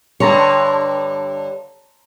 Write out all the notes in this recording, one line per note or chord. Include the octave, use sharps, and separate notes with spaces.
G2 D3 C#5 A5 A#5 C6